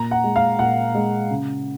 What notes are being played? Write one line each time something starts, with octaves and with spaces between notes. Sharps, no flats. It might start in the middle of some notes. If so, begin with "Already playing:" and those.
Already playing: A#2 A#5
F#5
G#3
F5
A#2 F#5
G#3
C#3